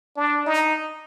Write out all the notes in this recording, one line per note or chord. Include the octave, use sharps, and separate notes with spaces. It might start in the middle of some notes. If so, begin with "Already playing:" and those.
D4
D#4